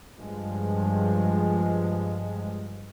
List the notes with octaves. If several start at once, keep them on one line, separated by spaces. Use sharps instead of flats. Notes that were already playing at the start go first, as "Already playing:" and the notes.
G2 F3 G#3